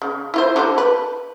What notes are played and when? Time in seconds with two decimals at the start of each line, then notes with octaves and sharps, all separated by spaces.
0.02 C#3
0.34 E4 F4 C5
0.56 D3 G3 C5
0.78 B4